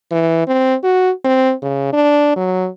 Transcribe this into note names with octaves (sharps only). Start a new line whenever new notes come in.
E3
C4
F#4
C4
C#3
D4
F#3